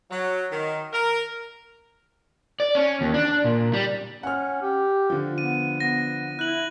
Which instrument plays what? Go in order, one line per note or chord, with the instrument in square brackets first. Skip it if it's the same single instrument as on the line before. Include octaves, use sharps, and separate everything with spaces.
[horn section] F#3
D#3
A#4
[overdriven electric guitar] D5
C#4
D#2
D4
A#2
G3
[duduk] C#4 [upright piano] F#5 F6
[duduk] G4
[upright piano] D3 F3
[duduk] B3 [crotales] D#7
[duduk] B3 [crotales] A#6
[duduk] E4 [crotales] F#6 F#7